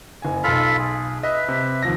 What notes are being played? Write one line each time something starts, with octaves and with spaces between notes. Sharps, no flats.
F#1 G#5
B1 F4 A4 B5 F6
G#4
B4 D#5 E5
C3
D#2 F3 A#6